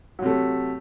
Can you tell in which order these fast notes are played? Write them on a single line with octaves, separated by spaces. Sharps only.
F#3 C3 A3